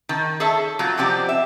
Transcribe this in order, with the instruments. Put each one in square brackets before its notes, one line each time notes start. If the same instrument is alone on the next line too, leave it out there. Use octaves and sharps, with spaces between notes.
[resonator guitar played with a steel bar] D#3
G#4 A4 C#5 E5
F#3 C4 F4
C3 F3 B3 C4 G4 D5
E5